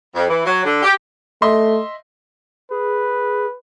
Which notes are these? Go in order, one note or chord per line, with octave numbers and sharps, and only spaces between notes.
F2
E3
F#3
D3
G4
A3 D#5 E5 C6
G#4 B4